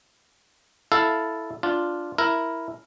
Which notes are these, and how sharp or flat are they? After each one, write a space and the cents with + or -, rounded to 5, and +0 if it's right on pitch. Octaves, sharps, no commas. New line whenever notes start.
E4 +0 A4 -5 F5 +0
D4 +0 F4 +0
E4 +0 A#4 +0